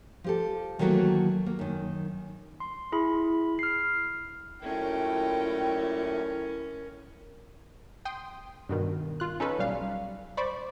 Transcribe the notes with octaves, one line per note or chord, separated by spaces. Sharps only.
F3 G4 A4
D#3 E3 F#3 A3 A#3 F#4
A#3
F#2 D#3
C6
E4 G#4 B5
F6 C7
F#2 A#2 A3 C#4 E4 A#4 G5
G5 C6 D#6
G2 B2 D#3
F4 F#6
C#4 D#4 A4 B4
B1 G3 F5
C5 D5 B5 C#6